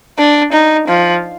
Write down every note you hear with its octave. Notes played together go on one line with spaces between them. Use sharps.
D4
D#4
F3